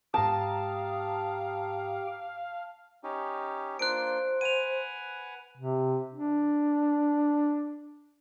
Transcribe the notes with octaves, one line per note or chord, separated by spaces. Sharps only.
G#2 G4 F5 G5 A5 A#5 D#6
C#4 D#4 G4
A#3 D4 F4 C5 F#6 D7
B4 F#5 G#5 D#7 F7
C3
D4